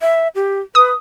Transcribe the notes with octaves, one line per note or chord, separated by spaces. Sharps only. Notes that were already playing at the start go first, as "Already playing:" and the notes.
E5
G4
B4 D#6